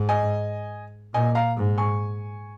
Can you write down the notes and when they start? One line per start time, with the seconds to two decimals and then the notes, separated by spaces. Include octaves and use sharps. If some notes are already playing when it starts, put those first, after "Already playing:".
Already playing: G#2
0.09 D#5 G#5
1.14 A#2 D#5 G#5
1.35 F5 A#5
1.57 G#2
1.78 G#5 C#6